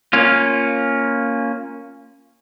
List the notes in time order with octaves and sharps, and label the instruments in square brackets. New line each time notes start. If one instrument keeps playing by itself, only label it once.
[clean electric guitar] A#3 C#4 F4